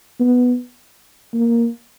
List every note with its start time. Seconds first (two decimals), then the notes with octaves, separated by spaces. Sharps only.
0.20 B3
1.34 A#3